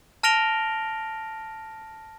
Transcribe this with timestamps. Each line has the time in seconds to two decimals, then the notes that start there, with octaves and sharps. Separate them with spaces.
0.23 A5 F6 A#6 D7 F7 G7